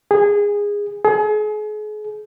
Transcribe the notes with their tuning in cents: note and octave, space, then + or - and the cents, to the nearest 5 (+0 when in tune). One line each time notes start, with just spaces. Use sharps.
G#4 -20
G#4 +35